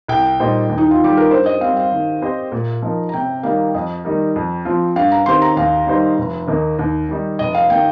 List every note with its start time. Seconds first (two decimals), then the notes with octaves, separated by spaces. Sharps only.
0.08 C2 G5
0.40 A#2 G3 D#4 C5
0.69 D#2
0.78 D#4
0.91 F4
1.00 D#3 G3 G4
1.17 A#4
1.30 G2 C5
1.46 D#5
1.61 G3 C4 F5
1.77 F5
1.92 D#3
2.21 C4 G4 C5 D#5
2.52 A#2
2.82 F3 D#4 A#4
3.09 A#5
3.13 C3 G5
3.43 D#3 G3 A#3 D#4 F5
3.74 F2 D#5
4.05 D#3 G3 D#4 A#4
4.36 F2
4.65 F3 C4 F4
4.96 G2 F5
5.12 A#5
5.26 D#3 C4 G4 C5 C6
5.42 A#5
5.57 D#2 F5
5.87 D#3 G3 D#4 C5
6.18 F1
6.48 D#2 D#3 A#3 D#4
6.79 D#2
7.09 D#3 G3 D#4
7.39 F1 D#5
7.55 F5
7.70 D#3 A#3 G5